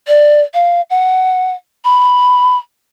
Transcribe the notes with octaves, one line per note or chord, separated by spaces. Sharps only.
D5
F5
F#5
B5